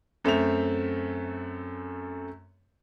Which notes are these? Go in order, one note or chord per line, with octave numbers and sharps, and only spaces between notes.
F#2 A3 C4 E5 F7